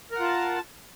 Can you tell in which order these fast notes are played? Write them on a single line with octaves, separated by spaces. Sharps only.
A#4 F#5 F4 A5